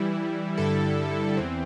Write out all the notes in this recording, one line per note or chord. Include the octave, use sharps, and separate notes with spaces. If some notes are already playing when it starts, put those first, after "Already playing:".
Already playing: E3 G3 E4
G2 D3 G3 E4 A4
E2 E3 C4